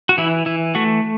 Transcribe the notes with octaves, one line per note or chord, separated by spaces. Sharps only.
F#4
E3 E4
E3 E4
A3 F#4